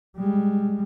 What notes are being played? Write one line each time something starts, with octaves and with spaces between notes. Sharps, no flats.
G3 G#3